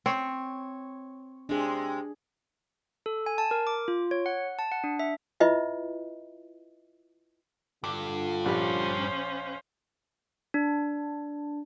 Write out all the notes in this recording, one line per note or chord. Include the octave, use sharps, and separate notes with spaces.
C4 C#5
C3 G#3 D4 G#4
A4
G#5
A5
A#4
D6
F4
C#5
F#5
A5
F#5
D4
E5
E4 F4 B4 D#5 E5
G2 D3 F4 D6
A#1 C#4 G4 C5 B5
D4